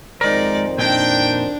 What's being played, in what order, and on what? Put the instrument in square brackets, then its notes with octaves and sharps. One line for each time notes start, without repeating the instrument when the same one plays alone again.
[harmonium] F2 D#3 C5 [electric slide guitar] G#3 A#4 [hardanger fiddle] D#4 D5
[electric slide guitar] A#2 D#4 [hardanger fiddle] D4 [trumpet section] G5